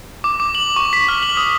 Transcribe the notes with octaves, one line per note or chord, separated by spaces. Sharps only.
D6
D6
F#7
C#6
B6
F6
F#7
D#6